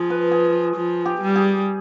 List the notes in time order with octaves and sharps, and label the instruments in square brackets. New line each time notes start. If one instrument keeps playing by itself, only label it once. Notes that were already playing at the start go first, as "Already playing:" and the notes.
Already playing: [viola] F3 [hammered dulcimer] G#4
[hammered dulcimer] B4
G#4
[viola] F3
[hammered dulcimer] G4
[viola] G3
[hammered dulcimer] G#4